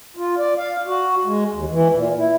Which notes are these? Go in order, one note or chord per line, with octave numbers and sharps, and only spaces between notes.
F4
D5
F5
F#4
G#3
D#2
E3
A#2
E4